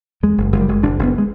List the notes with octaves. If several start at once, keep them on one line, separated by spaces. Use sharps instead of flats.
E2 G#3
F#1
F#1 G#3
G3
F#1 G#3
F#1 D4
F#1 B3
G#3